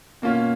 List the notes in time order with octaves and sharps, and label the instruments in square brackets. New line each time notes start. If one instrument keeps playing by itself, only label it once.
[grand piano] B2 A#3 C#4 F4